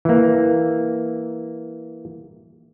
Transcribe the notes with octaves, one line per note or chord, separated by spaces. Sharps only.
E3 A#3